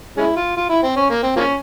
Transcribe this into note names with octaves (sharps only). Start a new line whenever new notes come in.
G#3 C#4 E4
F4
F4
E4
C4
C#4
A#3
C4
F3 A#3 C#4